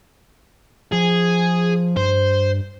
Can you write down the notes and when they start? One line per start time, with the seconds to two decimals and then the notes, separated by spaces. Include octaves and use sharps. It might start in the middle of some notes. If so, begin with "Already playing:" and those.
0.93 F3 G#4
1.97 G2 C5